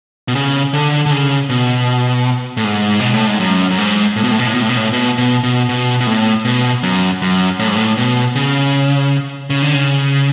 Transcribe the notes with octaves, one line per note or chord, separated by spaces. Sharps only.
B2
C#3
D3
D3
C#3
B2
A2
G#2
B2
A2
G#2
F#2
F#2
G#2
A2
B2
A2
B2
A2
B2
A2
B2
A2
B2
B2
B2
B2
B2
A2
B2
F#2
F#2
A2
G#2
A2
B2
C#3
C#3
D3
C#3